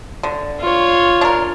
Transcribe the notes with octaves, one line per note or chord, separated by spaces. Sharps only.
D3
F4 C#5
D4 A#4